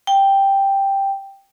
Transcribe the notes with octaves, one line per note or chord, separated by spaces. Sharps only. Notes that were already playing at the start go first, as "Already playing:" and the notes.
G5